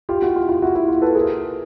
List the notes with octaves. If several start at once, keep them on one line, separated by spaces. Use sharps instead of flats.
F4 G4
E4 F#4
F4
F4
E4 F#4
E4 F#4
F4
A4 B4
G#4 A#4